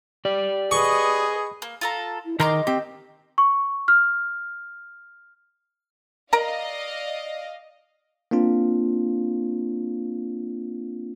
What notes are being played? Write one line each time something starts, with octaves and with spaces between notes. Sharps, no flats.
G4 D5
G#4 B4 D#5 C#6
A#3
F4 A4 A#5
E4
D#3 G#4 A#4 D#5 A#5 C6 D6
C4 G4 G5
C#6
F6
A#4 D5 D#5 F5 A#5
A#3 C4 D4 F4